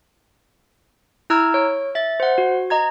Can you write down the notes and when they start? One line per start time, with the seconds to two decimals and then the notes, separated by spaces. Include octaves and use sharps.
1.30 E4 A#5 E6 F6 G#6
1.54 C#5
1.95 E5 A6
2.20 C5 F#5
2.38 F#4
2.70 D#5 A#5 G#6